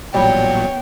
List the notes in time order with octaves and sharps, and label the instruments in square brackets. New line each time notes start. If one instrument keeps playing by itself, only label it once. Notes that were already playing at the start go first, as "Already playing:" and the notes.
[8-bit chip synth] A1 A#2 F#3 [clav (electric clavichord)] G3 [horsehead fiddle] B3 G5 [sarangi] C#5